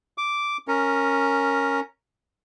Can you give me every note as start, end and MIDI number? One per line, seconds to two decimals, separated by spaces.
0.18 0.57 86
0.68 1.80 61
0.68 1.80 70